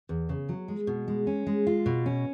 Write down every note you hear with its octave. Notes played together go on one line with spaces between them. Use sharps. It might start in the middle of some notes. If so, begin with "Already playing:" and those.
E2
C#3
F#3
G#3
B2
G#3
C#4
G#3
F4
B2
C#4